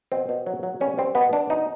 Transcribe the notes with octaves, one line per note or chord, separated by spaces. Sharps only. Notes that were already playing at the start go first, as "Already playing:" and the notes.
B2 C4
B2
F#3
F#3
G3 C#4
G3 C4
B2 B3
B2 D4
B2 D#4